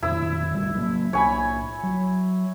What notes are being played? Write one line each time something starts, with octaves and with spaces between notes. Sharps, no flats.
F2 A#2 D#3 E4 E6
D#1 A1 G3
F#3 A3 A#3
B1 A#3 D4 C#5 G#5 B5
F#3